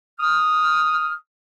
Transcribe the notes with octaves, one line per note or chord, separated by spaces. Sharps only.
D#6 F6